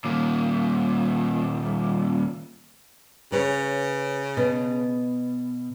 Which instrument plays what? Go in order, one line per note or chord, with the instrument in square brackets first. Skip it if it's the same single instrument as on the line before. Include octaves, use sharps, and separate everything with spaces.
[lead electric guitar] D#2 A#2
[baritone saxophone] C#3 [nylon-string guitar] B4 C#5
[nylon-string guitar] B2